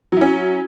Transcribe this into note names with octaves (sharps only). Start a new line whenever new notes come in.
F#3 C#4 E4